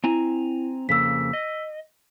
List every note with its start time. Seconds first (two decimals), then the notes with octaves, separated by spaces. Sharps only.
0.04 C4 E4 G#5 A#5
0.89 F2 C#3 A#3 E6 B6
1.33 D#5